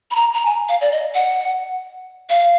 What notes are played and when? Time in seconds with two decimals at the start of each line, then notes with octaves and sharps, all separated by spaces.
0.11 B5
0.16 A#5
0.34 A#5
0.45 G#5
0.69 F5
0.81 D5
0.92 D#5
1.15 F#5
2.30 F5